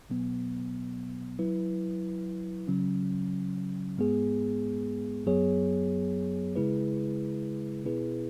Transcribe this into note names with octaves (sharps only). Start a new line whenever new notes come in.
B2 F#3 B3
F#3 E4 B4
C#3 F#3 C#4
G#2 G#3 B3 G#4
F#2 F#3 B3 G#4 C#5
C#3 G#3 E4 G#4 B4
B2 B3 E4 G#4 B4